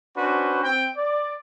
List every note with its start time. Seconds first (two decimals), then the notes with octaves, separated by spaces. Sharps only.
0.17 C#4 D4 F#4 B4 C5
0.63 C4 G5
0.97 D5